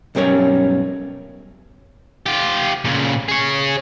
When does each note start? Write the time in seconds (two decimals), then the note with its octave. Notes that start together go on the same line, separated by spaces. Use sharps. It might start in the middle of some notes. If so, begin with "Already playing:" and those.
0.15 B1 G2 G3 C#4 A#4 C#5
2.26 F4 G4
2.85 A#2 C#3
3.28 G#4 C#5